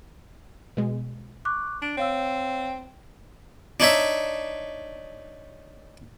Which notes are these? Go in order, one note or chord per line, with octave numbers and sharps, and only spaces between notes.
B2 G#3
C#6 D6 F#6
D4 D7
C4 C#5 F5 E6
D4 D#4 C#5 E5